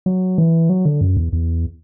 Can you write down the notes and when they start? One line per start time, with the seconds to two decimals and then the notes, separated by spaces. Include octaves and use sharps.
0.06 F#3
0.38 E3
0.69 F#3
0.85 D3
1.01 F#2
1.17 E2
1.33 E2